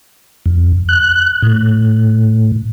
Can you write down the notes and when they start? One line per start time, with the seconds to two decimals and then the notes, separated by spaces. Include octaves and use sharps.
0.46 F2
0.89 F#6
1.42 A2